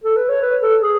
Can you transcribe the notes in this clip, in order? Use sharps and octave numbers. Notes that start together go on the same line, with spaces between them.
A4
B4
C#5
B4
A4
G#4